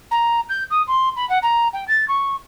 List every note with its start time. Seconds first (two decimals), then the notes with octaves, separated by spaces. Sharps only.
0.11 A#5
0.49 G6
0.71 D#6
0.88 C6
1.16 B5
1.29 F#5
1.43 A#5
1.73 G5
1.88 A6
2.08 C#6